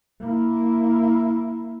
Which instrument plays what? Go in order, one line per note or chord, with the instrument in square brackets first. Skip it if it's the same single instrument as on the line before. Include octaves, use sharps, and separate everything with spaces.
[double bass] A#3 E4